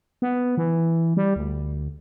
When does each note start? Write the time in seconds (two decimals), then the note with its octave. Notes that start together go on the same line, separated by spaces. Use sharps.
0.22 B3
0.57 E3
1.17 G3
1.36 D2